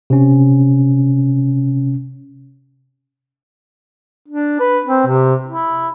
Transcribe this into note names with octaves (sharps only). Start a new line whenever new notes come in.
C3 C#4
D4
B4
C4
C3
E4